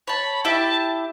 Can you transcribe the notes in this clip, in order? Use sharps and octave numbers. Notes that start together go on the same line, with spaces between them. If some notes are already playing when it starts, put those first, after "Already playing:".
C#5 A5 B5
E4 G4 E5 A5